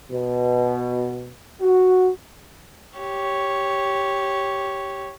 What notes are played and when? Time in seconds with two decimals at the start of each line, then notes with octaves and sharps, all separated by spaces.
0.12 B2
1.61 F#4
2.98 G4 C#5